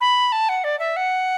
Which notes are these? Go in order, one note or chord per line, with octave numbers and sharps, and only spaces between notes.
B5
A5
F#5
D5
E5
F#5